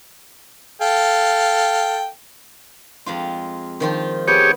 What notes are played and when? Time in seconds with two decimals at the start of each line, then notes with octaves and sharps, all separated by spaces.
0.81 A4 F5 G5
3.06 F2 G#3 F4
3.80 D#3 F3 F4
4.28 B3 G4 G#4 C#5